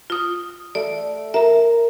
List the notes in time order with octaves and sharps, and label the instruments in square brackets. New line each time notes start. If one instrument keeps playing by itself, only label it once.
[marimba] F4 D#6
[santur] A3 [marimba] D5
[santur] A#4 [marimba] E5 A#5